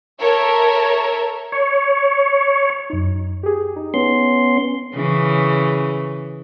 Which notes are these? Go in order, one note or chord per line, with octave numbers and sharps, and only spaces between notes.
A4 A#4 C#5 E5 A#5
C#5
F#2 D#4
G4 G#4
D#4
B3 C#4 C6
C#3 E3